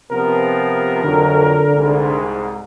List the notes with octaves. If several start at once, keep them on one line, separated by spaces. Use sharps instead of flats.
C3 F3 B3 A#4
F2 D3 F#3
C2 G#2